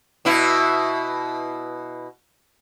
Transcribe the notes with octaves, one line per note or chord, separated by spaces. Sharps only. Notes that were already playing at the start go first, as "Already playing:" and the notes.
B2 E4